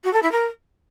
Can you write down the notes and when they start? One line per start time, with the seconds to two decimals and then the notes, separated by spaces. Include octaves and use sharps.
0.04 F#4
0.13 A4
0.22 E4
0.32 A#4